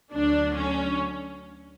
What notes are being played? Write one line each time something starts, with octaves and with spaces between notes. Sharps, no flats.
D2 D3 F#3 D4
C#4